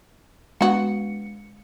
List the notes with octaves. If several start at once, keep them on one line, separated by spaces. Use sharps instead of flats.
G#3 B3 F#4 C#7